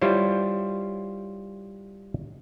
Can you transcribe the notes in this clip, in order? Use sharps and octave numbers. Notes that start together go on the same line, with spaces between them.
G3 E4 F4 C5 C#5